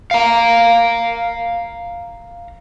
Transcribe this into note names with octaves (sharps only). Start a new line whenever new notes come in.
F5 A#5